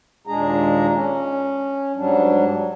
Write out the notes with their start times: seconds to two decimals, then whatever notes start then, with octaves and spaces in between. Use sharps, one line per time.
0.27 D#2 A#2 G#3 D4 G#4 A#5
0.93 C#4
1.96 G#2 F#3 G3 D4